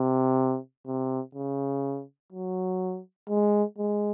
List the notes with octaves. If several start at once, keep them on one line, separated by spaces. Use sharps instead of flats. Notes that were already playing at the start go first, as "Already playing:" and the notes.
Already playing: C3
C3
C#3
F#3
G#3
G#3